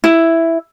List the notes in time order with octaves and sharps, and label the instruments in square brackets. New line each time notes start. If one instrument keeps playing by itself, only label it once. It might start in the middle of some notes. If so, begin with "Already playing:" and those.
[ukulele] E4